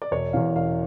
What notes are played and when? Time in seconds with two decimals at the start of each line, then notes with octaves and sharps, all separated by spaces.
0.02 D5
0.11 E1 C#5
0.33 E2 E3 F5
0.55 E1 F5